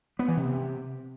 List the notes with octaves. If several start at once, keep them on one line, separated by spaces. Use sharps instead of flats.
B3
E3
C3